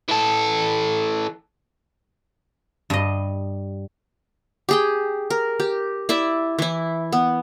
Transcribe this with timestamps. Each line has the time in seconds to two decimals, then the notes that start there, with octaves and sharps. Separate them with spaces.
0.08 E3 A4
2.90 G2 D#5
4.69 G4 G#4 G5
5.30 A#4
5.60 G4
6.09 E4 D5 E5
6.59 E3 E4
7.12 B3